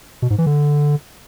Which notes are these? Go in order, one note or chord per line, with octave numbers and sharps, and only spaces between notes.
B2
G#2
E3
D3